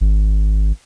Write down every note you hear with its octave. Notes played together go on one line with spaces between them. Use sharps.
G#1